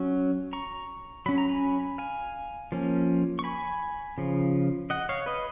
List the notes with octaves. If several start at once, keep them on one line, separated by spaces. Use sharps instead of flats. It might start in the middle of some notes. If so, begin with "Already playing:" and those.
Already playing: F#3 C#4
A#5 C#6
F#3 C#4 B5
A#5
G#5 B5
F5 G#5
F3 A#3 C#4
C#6
G#5 B5
C#3 F3
D#5 F#5
C#5 F5
B4 D#5